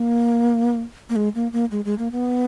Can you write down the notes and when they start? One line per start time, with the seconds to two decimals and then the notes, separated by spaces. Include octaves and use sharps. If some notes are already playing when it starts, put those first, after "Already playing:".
Already playing: A#3
1.09 A#3
1.16 G#3
1.35 A#3
1.53 A#3
1.71 G#3
1.85 G#3
1.99 A#3
2.12 B3